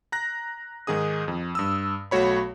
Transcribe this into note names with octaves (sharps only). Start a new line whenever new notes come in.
A#5 F#6 A#6
G#2 D#3 D#4 G#4 D#6
F2
G2 D#6 E6
B1 A3 F#4 C#5 B5